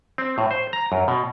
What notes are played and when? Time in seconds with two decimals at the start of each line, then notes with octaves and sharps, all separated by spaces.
0.18 C4
0.38 A2
0.51 C5
0.73 A#5
0.92 F#2
1.08 B2